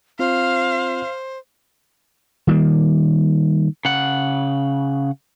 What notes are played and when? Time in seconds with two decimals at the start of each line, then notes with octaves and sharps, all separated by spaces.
0.19 C4 F4 C5 F5
2.47 D#3 G3 A#3
3.85 C#3 F#5